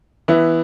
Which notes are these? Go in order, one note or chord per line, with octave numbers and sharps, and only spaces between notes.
E3 B3 E4